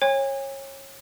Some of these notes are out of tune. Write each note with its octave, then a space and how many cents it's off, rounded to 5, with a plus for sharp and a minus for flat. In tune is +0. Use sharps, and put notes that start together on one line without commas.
C#5 -25 G#5 -40